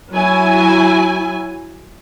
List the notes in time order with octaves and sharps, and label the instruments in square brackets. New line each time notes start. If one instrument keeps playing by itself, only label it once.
[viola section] F#3 E4 G#5